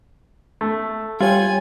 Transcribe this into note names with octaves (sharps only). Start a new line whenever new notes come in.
A3
G3 F4 C#5 G5 G#5